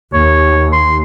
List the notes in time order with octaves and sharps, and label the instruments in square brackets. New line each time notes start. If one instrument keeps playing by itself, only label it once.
[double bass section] D#2 [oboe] C#5
[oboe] C6